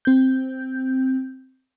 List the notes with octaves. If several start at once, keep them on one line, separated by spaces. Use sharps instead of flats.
C4 G6